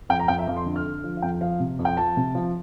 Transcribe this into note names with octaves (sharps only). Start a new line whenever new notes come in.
F2 G5
A#5
F2 G5
E5
F2 F5
C6
D3
F6
D3
F3
F5
F2 G5
F3 F5
C3
F2
G5
F3 A5
C3
F3